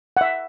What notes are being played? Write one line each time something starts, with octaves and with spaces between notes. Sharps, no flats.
F#5
E5